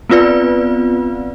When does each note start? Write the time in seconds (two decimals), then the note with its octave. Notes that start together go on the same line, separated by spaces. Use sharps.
0.10 B3 C4 F4 B4 D5